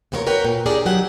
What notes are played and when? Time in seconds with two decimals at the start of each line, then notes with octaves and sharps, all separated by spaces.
0.12 E2 A#2 B3 F4 A#4 C#5
0.26 F#4 A#4 B4 C#5 G5
0.45 A#2
0.66 D4 G4 G#4 A#4 C#5 D5
0.86 F#3 D#4 G4 F#5